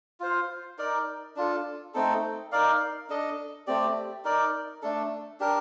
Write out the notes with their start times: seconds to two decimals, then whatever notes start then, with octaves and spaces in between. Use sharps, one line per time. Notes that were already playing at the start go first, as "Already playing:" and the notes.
0.20 F4 C5 F5
0.78 D#4 A#4 D5
1.36 D4 F4 A4
1.94 A3 C4 D#4 A4
2.52 D#4 A#4 D5 F5
3.09 D4 A4 D#5
3.67 A3 C4 G4 D5
4.24 D#4 A#4 D5
4.82 A3 D4 A4
5.40 D4 G4 A#4